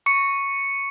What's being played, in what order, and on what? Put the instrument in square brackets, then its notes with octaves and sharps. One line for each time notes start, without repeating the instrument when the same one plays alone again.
[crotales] C#6 C#7